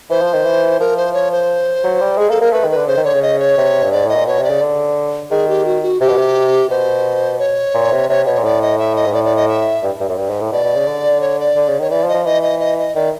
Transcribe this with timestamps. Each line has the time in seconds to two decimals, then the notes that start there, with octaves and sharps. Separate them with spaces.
0.10 E3 C5
0.21 F3
0.33 D#3
0.44 E3
0.80 F3 A#4
0.97 C5
1.14 C#5
1.32 C5
1.84 F#3
2.01 G3
2.18 G#3 G#4
2.29 A#3 A4
2.41 A#3 A#4
2.53 A3 B4
2.64 D#3
2.70 B4
2.77 D3
2.87 C#3 C5
2.97 D#3
3.05 D3 C#5
3.14 C#3
3.22 D#5
3.39 C#5
3.57 C3
3.83 G2
3.92 G#2 D5
4.05 A2 D#5
4.15 A#2
4.26 B2 C#5
4.38 C3
4.44 D5
4.50 C#3
4.61 D3
5.31 D#3 G#4
5.49 G4
5.65 F#4
5.83 F#4
6.00 C3 G4
6.09 B2
6.17 C3
6.70 B2 C5
7.39 C#5
7.74 A#2
7.92 C3
8.09 C3 C#5
8.26 B2 C#5
8.38 A#2
8.44 A2 D5
8.62 D#5
8.78 E5
8.96 D#5
9.06 G#2
9.13 A2 D5
9.24 D5
9.36 D#5
9.48 E5
9.83 G2
10.00 G2
10.09 F#2
10.18 G2
10.29 G#2
10.40 A2
10.52 B2 D5
10.64 B2
10.76 C#3
10.87 D3
11.21 C#5
11.40 D5
11.56 D3
11.68 C#3
11.80 D#3 C#5
11.90 E3 D5
12.03 F3
12.08 D#5
12.14 F3
12.25 E3 D#5
12.43 D#5
12.60 D#5
12.78 D#5
12.95 D#3 D5